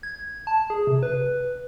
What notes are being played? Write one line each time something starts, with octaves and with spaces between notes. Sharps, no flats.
G#6
A5
G#4
C3
B4